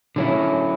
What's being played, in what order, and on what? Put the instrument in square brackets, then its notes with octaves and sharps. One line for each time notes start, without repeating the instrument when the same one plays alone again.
[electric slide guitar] D3 F#3 C#4 E4